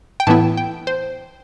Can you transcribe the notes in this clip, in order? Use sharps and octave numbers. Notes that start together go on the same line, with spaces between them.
G5
A2 E3 B3 E4 A5
G5
C5